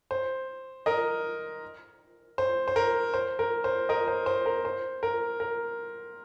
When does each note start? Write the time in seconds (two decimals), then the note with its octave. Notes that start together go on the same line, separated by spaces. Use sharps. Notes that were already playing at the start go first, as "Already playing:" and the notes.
0.11 C5
0.86 A#4 D#5
2.38 C5
2.68 C5
2.76 A#4
3.14 C5
3.39 A#4
3.64 C5
3.89 A#4 D#5
4.08 C5
4.26 C5
4.46 A#4
4.65 C5
5.03 A#4
5.40 A#4